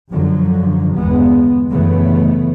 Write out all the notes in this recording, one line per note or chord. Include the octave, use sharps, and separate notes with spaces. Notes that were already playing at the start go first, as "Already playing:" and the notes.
F#2 D3 F3 F#3
G1 E2 G#3 B3
F#2 C#3 E3 A3 B3